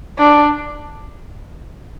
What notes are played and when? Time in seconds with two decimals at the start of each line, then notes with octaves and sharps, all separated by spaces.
0.19 D4